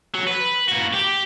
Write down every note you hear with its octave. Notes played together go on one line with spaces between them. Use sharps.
F#3
B4
A#3 F#4
G4